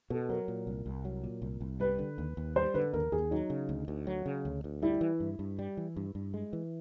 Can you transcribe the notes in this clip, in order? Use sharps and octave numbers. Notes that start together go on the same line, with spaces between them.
B2 A4
F#3 A#4
A#2
C2
C2
F#3
A#2
C2
C2
G3 B4
D3
D#2
D#2
G3 C5
D3 B4
D#2 A#4
D#2 G#4
F#3 D#4
C#3
D2
D2
F#3
C#3
D2
D2
G3 E4
E3
G2
G2
G3
E3
G2
G2
G#3
E3